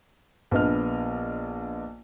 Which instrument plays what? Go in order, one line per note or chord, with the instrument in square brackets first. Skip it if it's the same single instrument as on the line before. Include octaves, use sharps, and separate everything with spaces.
[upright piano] A#1 B3 D4 D#5 F6